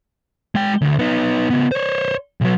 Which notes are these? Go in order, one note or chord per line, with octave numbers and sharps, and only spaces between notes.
G#3 G5
D2
B3 D#4
C#3 B3
C5 C#5
B1 F#3